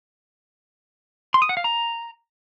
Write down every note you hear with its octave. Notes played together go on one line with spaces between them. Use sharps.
C6
D#6
F#5
F5
A#5